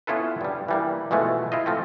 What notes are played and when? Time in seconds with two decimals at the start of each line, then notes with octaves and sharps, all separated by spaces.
0.07 B3 C#4 E4 F4 A4 B4
0.41 G2 G3
0.68 E3 G3 A#3
1.11 B2 E3 F3 G#3 A3
1.52 E4 F4 D#5
1.66 F3 A3 C4